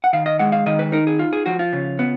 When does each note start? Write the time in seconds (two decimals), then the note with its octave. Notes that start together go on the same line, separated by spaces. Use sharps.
0.04 F#5
0.13 D#3 F5
0.26 D#5
0.39 G#3 F#5
0.52 F5
0.66 D#3 D#5
0.79 B4
0.92 D#4 A#4
1.07 G#4
1.19 F4
1.33 G#4
1.46 F3 F#4
1.59 F4
1.73 C#3
1.99 B3